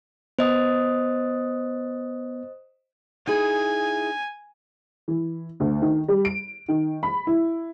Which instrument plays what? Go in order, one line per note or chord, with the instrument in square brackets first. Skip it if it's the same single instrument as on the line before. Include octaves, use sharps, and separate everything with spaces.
[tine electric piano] B3 [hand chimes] C5 D#5 D#6
[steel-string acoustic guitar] D#4 E4 G#4 [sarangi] G#5
[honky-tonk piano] E3
D2
D#3
G3
D7
D#3
B5
E4